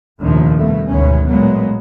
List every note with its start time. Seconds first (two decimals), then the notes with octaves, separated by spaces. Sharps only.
0.19 F1 A#1 D#2 C3 D#3 F3
0.56 G2 B2 A3
0.89 G#1 D2 B2 D#3 C#4
1.28 A1 A#2 F#3 G#3 A#3 B3